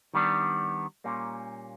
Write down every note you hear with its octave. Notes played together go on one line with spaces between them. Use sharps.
D#3 G3 B3 D4
A#2 G3 A#3 C#4